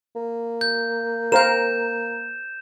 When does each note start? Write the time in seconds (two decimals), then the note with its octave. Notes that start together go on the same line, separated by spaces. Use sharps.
0.16 A#3
0.61 G6
1.32 A#4 C5 F5 G6 E7